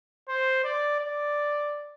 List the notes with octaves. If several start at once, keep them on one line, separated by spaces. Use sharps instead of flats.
C5
D5
D5